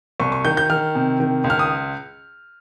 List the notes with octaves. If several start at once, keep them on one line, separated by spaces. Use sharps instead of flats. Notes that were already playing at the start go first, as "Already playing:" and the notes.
C2 C#6
C#6
D#3 G6
G6
D#3 F6
C3
D#3
C#2
F6
D#6